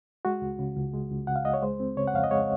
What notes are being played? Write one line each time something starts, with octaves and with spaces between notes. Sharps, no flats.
G#3 F#4
C#2
C#3
C#2
G#3
C#2
C#3 F#5
F5
C#2 D#5
C#5
G#3 C5
C4
C#3 C#5
F#5
F2 F5
D#5
G#3 C#5